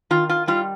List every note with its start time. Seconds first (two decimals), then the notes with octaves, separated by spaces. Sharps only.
0.10 D#3 F4
0.29 F4
0.47 G3 F4